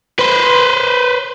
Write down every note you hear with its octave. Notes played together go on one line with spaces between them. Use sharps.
B4 C5